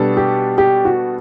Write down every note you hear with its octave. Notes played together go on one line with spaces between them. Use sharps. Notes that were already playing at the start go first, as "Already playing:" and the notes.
Already playing: B2 G3 B3 D4 A4
G4
G4
F#4